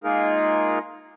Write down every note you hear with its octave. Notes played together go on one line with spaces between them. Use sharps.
G#3 A#3 D#4 F4 G#4 A#4